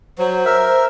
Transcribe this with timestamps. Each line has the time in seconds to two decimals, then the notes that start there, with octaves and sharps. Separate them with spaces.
0.19 F#3 C5
0.45 A#4 E5